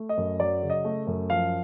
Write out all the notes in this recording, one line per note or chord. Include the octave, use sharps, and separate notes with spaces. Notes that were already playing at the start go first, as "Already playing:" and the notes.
Already playing: A3
D#5
F#2
F#3 D5
C#3
D#5
A3
F#2
F3 F5